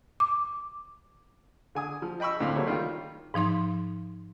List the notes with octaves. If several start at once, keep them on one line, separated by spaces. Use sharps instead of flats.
D6
D3 G#5 D#6
F3
D#5 G5 B5 C#6 E6
D2 A2 C4 F5 B5 C6
F#3 G3 A3 A#3 C#5
D#3 G3 F4 G5
G#2 F3 D#4 C6